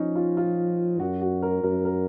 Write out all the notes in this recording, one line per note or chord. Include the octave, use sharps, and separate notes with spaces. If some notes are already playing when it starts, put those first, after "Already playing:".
Already playing: F3 C#4 D#4
F4
F4
F#2 F#4
F#4
A#4
F#2 A#4
A#4